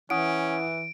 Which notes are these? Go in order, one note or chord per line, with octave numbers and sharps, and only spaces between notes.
E3 C#4 E4 F#5 D#6 D7